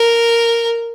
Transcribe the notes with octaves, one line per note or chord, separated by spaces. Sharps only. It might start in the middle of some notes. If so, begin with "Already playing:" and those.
Already playing: A#4